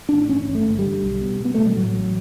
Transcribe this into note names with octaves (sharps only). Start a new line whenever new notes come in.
A1 D4
G1 C#4
G1
A3
G1
G3
D3
B1
B2
B2 B3
B2 A3
G3
A2 F#3
A1